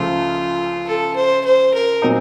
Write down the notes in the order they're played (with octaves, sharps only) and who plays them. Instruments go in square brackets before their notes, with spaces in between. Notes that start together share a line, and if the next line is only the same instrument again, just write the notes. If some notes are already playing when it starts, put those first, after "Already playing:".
Already playing: [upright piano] C#2 C#3 F3 A3 [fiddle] F4
[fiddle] A4
C5
C5
A#4
[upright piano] A#2 F#3 C4 D#4